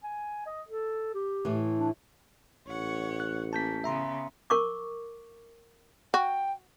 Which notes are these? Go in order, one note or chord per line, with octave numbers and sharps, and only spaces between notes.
G#5
D#5
A4
G4
A2 E3
D4
A1 C#5 F#5
F#6
A#3 C#4 A5 G6 B6
C#3 B3 E5 A#5 C6
A#4 C#6 D6
F#4 G5